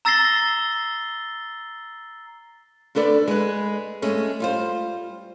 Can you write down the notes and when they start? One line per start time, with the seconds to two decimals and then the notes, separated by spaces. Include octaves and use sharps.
0.05 A#5 E6 A6 A#6 C7 G7
2.95 D2 D4 A4 B4 D5
3.28 G#3 B4
4.02 G#3 A3 C#4
4.40 G3 F4 C5